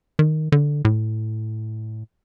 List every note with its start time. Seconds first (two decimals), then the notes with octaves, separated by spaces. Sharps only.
0.19 D#3
0.52 D3
0.85 A2